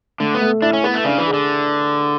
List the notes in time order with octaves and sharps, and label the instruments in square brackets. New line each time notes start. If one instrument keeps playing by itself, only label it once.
[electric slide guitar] D3 [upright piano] A3
[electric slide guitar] B3
[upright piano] A3
[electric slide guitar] D4 [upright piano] E4
[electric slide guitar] C#4
[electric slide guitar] B3 [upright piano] B4
[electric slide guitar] A3
[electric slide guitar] C#3 [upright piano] D4
[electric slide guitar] E3
[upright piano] G#4
[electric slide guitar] D3